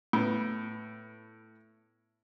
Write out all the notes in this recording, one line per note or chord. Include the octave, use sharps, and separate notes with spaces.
A2 B3